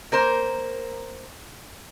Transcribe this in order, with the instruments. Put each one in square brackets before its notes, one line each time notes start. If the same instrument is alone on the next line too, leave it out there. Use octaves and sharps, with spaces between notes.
[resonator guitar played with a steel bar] A#3 A#4 C5